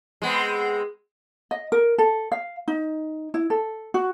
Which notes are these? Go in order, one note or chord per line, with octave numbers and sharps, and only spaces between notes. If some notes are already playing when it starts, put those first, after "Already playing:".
G#3 B3 C4
D#5
A#4
A4
F5
D#4
E4
A4
F#4